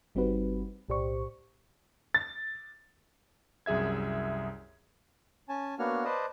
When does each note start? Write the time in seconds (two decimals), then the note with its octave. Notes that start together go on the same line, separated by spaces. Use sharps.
0.15 G1 G3 C4 D#4 F#4 B4
0.89 B1 A2 G4 C5 D5 C#6
2.14 A6
3.66 C2 F#2 G#4 E5 G#6
5.49 C#4 G#5 A5
5.79 A#3 B3 D4 F#4 C#5 F6
6.04 B4 C5 D5 D#5 A5